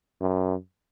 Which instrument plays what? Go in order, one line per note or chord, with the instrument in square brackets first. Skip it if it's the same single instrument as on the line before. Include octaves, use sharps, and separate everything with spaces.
[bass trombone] F#2